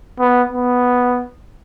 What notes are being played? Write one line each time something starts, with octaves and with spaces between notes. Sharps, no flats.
B3
B3